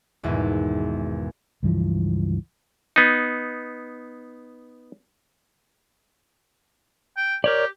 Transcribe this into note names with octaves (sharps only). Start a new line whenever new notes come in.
G#1 E2 G#2 B2
C#2 G2 E3 F3
B3 D#4
G5
G4 A#4 C#5 D5